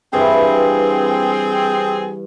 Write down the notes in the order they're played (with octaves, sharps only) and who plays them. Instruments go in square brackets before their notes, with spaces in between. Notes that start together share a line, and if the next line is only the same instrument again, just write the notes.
[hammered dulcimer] G2 E3 F5 [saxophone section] C4 G#4